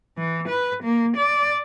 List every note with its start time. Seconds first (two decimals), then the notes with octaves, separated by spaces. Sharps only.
0.18 E3
0.48 B4
0.83 A#3
1.17 D5